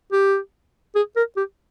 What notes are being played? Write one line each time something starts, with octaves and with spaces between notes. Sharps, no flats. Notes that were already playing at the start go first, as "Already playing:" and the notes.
G4
G#4
A#4
G4